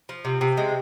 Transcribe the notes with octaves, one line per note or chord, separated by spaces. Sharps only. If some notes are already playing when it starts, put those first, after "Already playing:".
F3
C3
C3
G#3